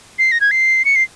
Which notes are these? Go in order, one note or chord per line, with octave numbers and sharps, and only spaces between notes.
C7
A#6
G#6
C7
C#7
C7